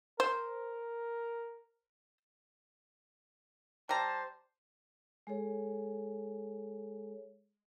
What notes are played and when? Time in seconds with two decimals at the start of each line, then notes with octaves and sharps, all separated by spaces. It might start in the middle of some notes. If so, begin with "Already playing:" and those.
0.20 A#4 C5
3.89 G3 C5 A5 A#5
5.27 G#3 G#4 A4 C#5